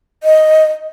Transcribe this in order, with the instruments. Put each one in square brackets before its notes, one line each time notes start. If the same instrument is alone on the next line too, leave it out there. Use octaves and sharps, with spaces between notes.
[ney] D#5